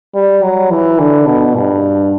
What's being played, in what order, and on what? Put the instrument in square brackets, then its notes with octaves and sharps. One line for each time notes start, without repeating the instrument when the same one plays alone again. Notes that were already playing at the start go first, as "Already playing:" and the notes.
[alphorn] G3
F#3
E3
D3
B2
G2